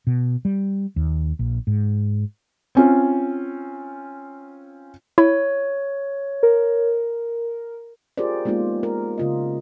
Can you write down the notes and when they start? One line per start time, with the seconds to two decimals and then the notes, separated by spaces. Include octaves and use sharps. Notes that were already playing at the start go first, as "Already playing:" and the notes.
0.07 B2
0.45 G3
0.96 D#2
1.39 A#1
1.67 G#2
2.75 C4 C#4 F4
5.18 E4 C#5
6.43 A#4
8.17 F4 G4 G#4 A#4 C5 D5
8.45 G#3 A#3 B3 D#4 F4
8.83 A#4
9.18 C#3 F4 D#5